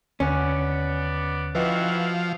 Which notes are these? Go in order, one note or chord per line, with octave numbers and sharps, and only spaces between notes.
D#2 D3 B3 C#4 D5 C#7
E3 F3 E4 F#4 B4 D#5 G5